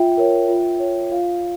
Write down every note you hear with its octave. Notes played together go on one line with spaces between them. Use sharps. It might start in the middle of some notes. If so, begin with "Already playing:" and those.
Already playing: F4 E5 G5
A#4 C#5
F4
C#5
F4 F5